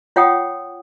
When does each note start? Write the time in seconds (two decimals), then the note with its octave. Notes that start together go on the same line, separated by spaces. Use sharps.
0.16 F4 C#5 F#5 G5 D#6